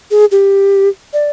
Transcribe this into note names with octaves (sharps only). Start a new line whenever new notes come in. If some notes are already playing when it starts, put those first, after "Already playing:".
G#4
G4
D5